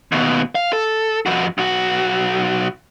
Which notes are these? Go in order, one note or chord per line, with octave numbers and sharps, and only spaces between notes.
D#2 B2
F5
A4
F2 F#4
B1 F#4